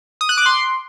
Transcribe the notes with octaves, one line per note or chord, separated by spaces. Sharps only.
D#6
F#6
D6
C6